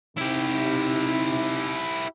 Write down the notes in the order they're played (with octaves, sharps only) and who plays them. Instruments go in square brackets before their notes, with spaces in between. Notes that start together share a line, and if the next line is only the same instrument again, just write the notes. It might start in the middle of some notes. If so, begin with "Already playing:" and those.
[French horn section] C3 D#4 [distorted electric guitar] E4 G4